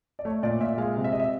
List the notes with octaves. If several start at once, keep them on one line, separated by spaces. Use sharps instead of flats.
D5
A3 C#5
A#2 D5
A#2 E5
G#3 F5
C3
E5
C3 D#5
E5